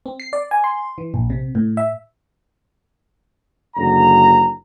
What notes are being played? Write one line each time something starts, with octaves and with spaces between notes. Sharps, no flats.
C4
C7
D5
G#5
C6
E3
A#1
C3
A2
E5
F#1 D3 A#5